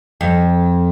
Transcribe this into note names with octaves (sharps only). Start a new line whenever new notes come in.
F2